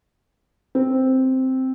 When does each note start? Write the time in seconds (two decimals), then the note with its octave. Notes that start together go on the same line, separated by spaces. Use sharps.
0.75 C4